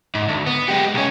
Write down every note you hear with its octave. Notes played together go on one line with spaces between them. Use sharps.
G#2
D2
B3
G#3 G4
B1 C#4